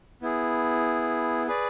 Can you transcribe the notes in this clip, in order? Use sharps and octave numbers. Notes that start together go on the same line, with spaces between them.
B3 E4 G#4
G#4 B4 D5